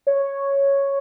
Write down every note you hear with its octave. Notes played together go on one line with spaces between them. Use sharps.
C#5